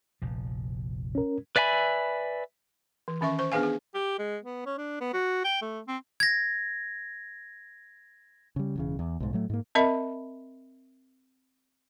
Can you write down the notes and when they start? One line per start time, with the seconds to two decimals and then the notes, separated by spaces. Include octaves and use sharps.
0.22 F1 A#1 F3
1.15 C#4 A#4
1.56 B4 D5 E5 G#5 B5
3.08 E3
3.21 D#3 C#4 E5 C#6
3.39 C5 C#6
3.52 B3 D4 G#4 B4 F5 G#5
3.63 G#4
3.94 G4
4.19 G#3
4.43 B3
4.66 C#4
4.78 D4
5.01 B3
5.14 F#4
5.45 G5
5.62 A3
5.88 C4
6.20 G#6 A#6
8.56 C#3 G3
8.76 E1 E2 C#3
8.99 E2
9.20 B1 G#2
9.33 A2 F#3 A3
9.50 G#2 A#3
9.75 C4 A#4 D#5 E5 B5